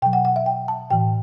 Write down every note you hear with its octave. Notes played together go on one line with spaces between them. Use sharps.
B2 F#3 G5
F#5
F#5
E5
G5
A5
A2 E3 G5